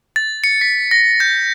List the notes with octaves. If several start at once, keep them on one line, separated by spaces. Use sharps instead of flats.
A6
C#7
B6
A#6
G6